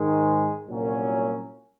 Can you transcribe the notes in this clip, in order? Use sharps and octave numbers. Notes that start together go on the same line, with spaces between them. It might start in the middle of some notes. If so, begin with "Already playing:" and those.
Already playing: G#2 D#3 G#3
C2 A#2 F#3 C#4